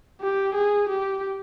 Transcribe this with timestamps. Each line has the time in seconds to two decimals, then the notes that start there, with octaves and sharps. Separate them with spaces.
0.21 G4
0.55 G#4
0.89 G4